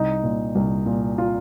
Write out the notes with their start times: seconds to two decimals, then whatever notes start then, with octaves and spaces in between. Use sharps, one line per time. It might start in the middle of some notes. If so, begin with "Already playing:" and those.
Already playing: C2 D#4
0.24 A#2
0.55 C2
0.86 A#2
1.18 F4